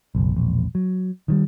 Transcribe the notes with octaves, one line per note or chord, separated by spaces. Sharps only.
F#1 B1
E1 A#1
F#3
D#3 E3 G3